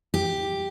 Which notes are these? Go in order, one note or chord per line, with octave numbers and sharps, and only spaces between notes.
G4